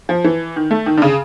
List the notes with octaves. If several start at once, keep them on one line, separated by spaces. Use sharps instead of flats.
F3
E3
D#3
A3
D#3
D3
C#3